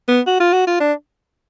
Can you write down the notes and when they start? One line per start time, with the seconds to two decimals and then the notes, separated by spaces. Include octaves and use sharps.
0.08 B3
0.27 F#4
0.40 F4
0.53 F#4
0.67 F4
0.80 D4